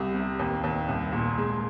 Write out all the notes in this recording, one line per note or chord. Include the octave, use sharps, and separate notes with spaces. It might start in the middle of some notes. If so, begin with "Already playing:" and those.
Already playing: C2 G3
C3
D#2
D#2
C2
A#2
G#3